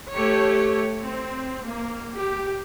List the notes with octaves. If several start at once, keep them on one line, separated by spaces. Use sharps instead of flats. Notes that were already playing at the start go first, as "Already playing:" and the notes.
A3 G4 C#5
C4
A#3
G4